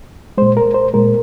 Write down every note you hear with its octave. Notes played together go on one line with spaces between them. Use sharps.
A#2 G#3 C5
A#4
C5
A#2 G#3 A#4